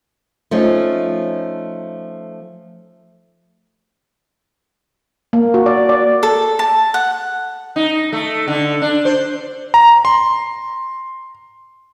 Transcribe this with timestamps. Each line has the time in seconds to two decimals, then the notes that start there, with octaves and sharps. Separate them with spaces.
0.51 F3 A3 C#4 D#4
5.33 A#3
5.54 F#4
5.66 D5
5.89 D5
6.23 A4
6.59 A5
6.94 F#5
7.76 D#4
8.13 A3
8.48 D3
8.82 D4
9.05 C5
9.74 A#5
10.05 C6